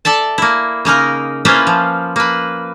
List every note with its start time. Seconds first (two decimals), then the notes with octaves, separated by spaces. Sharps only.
0.05 A4 D5 E5 A5
0.38 A#3 E4
0.85 C#3 A#3 D#4 A#4
1.45 A#3 C#4 E4 F4 B4 C5
1.67 F3
2.16 A#3 B4